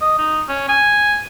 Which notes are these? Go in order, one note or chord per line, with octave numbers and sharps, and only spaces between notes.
D#5
D#4
C#4
G#5